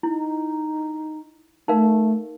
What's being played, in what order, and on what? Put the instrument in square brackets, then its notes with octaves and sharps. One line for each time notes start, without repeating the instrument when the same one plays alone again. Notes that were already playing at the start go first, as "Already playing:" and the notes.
[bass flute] D#4 [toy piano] E4
[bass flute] A3 [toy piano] D#4 A#4 F5